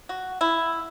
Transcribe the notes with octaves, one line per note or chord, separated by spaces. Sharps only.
F#4
E4